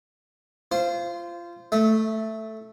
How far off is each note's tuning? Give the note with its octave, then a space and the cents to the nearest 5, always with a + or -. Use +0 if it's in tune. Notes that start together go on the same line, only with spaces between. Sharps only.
F4 -20 C5 +0
A3 +0 E5 -30